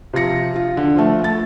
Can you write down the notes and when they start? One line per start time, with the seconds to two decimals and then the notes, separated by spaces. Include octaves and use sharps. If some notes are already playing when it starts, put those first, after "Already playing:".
0.13 C3 F3 F4 A#6 C#7
0.56 F4
0.77 D3
0.96 F3 A3
1.22 A3 A6